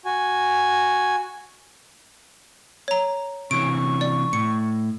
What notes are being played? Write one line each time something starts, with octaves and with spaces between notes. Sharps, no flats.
F#4 G#5
C#5 A#5
C3 E3 C#4 C#6 D7
D5
A2 C#7